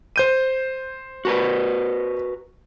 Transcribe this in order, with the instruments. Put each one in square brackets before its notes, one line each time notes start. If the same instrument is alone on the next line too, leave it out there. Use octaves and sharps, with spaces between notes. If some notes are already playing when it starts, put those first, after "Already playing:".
[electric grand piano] C5 G6 D#7
[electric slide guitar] F#4 A#4 B4